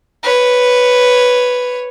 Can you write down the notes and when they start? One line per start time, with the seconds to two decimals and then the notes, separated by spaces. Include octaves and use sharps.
0.23 B4 C#5